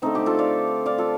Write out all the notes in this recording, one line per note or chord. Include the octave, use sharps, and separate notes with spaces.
D3 A3 C4 D#4
D#4 G4
F4 A4
D5 F5
D5 F5
F4 A4